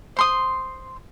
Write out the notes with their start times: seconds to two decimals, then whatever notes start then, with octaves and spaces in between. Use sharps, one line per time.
0.17 C5 C6 D#6